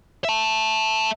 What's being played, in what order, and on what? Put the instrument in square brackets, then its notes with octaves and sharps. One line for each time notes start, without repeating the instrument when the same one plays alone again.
[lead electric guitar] E5 A5